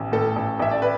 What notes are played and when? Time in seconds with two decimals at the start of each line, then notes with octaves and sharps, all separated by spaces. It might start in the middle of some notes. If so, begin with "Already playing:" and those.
Already playing: A1
0.12 A2 A4
0.36 A1
0.59 A1 E5
0.71 D5
0.82 B4